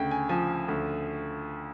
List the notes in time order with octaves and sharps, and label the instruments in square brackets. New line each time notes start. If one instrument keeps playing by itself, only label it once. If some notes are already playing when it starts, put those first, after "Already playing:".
Already playing: [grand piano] D2 C#3 G5
G#5
F3 G#5
D2